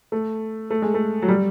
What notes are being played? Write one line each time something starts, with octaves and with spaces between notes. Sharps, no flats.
A3
A3
G#3
A3
F#3
G3